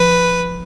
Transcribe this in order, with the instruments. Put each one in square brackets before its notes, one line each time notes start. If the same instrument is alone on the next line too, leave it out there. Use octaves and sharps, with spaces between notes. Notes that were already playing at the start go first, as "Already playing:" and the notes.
Already playing: [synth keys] F3 [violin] B4